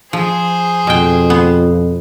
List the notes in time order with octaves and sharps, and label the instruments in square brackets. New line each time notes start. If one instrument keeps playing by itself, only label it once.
[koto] F3 [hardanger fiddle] G#4 C5
[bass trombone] F2 [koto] B2 G5
[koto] B3